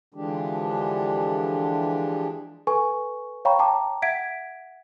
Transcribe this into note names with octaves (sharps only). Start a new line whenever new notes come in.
D3 E3 F3 G#3 D4 G4
A4 B4 G#5 C#6
C#5 F5 G5 A#5 B5 C#6
G5 A5 A#5 D6
E5 F#5 G#6 B6 D7